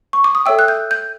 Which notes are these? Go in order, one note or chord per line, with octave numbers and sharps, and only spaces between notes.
C#6
D6
D#6
A4 C#5 E5 G5 E6
F#6
G6
G6